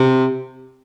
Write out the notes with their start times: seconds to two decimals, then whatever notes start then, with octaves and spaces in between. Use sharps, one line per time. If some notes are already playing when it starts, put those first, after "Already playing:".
Already playing: C3